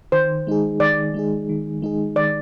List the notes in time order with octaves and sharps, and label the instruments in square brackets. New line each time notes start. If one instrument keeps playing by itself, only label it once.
[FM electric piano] D#3 [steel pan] C5
[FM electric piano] G#3 D#4 G#4
[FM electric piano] D#3 [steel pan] D5
[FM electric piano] G#3 D#4 G#4
D#3
G#3 D#4 G#4
[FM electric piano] D#3 [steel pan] D5